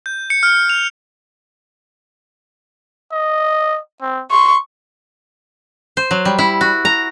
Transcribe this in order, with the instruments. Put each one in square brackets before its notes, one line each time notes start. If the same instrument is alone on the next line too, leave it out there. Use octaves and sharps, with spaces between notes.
[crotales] G6
C#7
F6
F7
[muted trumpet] D#5
C4
[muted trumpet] C6 [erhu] C#6
[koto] C5
F#3
G3
E4
F#4
A#5